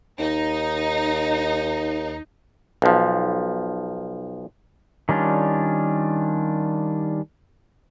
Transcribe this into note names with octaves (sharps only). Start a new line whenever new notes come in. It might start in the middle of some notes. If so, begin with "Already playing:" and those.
D#2 D#4
B1 F3
D#3 G3 C#4 D4 F4